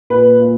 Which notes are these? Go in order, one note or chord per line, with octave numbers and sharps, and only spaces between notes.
A#2 B4
A#2